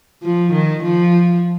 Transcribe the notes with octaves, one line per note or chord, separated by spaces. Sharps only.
F3
D#3
F3